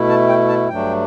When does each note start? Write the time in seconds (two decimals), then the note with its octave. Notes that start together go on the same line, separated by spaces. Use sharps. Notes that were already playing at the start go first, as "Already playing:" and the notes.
Already playing: B2 A3 E4
0.09 A5
0.29 G5
0.49 A5
0.69 G2 F#3 A3 D4 G5